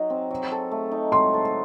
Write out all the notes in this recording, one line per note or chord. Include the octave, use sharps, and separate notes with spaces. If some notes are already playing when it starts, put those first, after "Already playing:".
Already playing: F#3 D#4
C4
F#3
A4
A3
D#4
F#3 C6
A4